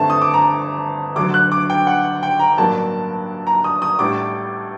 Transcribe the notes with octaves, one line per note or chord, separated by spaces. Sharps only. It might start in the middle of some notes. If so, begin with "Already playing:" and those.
Already playing: G1 G2 D3 A3 C4 A5
D#6
D6
A#5
D2 D3 F#3 D6
F#6
D6
G5
F#5
G5
A#5
A1 G2 F#3 A#3 D4 A5
A#5
D#6
D#6
A1 A2 G3 D4 D6